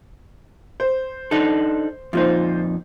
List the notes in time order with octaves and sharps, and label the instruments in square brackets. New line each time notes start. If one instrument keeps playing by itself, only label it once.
[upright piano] C5
[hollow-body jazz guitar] D4 D#4 A4
[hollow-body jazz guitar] F2 A#2 D#4 [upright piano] F4 C5